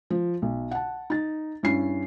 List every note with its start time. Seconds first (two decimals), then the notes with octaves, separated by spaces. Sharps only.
0.10 F3
0.42 B1
0.71 F#5 A5
1.10 D#4 A6
1.63 G2 C#4 E4 C7